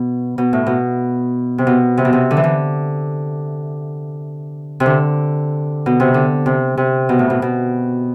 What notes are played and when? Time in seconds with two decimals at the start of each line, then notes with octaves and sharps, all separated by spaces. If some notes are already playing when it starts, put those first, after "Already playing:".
Already playing: B2
0.38 B2
0.53 A2
0.67 B2
1.58 C3
1.67 B2
1.97 C3
2.05 B2
2.13 C3
2.31 D3
2.37 E3
2.44 D3
4.80 C3
4.86 D3
5.86 B2
6.00 C3
6.14 D3
6.46 C3
6.77 C3
7.09 B2
7.19 A2
7.30 B2
7.42 B2